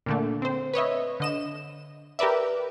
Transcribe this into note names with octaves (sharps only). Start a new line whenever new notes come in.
A#2 D3 A3
C4 C5
B4 C#5 D#5 E5
D3 D#5 E7
G4 A#4 B4 D5 E5